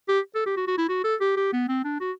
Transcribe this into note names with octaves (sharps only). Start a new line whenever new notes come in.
G4
A4
G4
F#4
F#4
E4
F#4
A4
G4
G4
B3
C4
D4
F#4